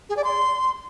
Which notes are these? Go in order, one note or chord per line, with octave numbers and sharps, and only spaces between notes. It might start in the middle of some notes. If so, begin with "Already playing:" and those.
G#4
D5
C6